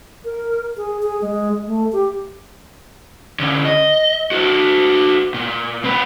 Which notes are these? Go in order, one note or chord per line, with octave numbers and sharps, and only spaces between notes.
A#4
G#4
G#4
G#3
A3
G4
D3 C#4
D#5
F#4 A4
A#2
C4 B4